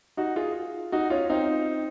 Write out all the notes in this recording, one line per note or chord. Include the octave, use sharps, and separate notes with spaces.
D#4 F#4
F4 G#4
D#4 F#4
C#4 F4
C4 D#4